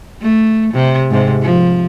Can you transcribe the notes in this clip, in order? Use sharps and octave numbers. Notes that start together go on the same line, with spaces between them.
A3
C3
G#2 C3
F3